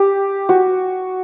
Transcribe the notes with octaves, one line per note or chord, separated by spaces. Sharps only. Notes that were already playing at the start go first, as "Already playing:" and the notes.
Already playing: G4
F#4